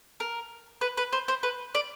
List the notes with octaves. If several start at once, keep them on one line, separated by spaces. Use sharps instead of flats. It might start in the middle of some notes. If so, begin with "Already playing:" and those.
A#4
B4
B4
C5
C5
B4
D5